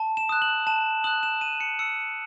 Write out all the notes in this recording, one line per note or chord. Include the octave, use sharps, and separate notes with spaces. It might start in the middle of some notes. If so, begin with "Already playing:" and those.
Already playing: A5
E7
D#6 F#6
F#7
A5 E7
D#6 F#6 F#7
E7
A5 D#7
C#7
E6 C#7